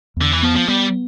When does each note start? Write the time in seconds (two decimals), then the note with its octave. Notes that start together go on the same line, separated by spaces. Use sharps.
0.17 E2 D3
0.32 E3
0.43 F3 B3
0.56 F3
0.68 G3 B3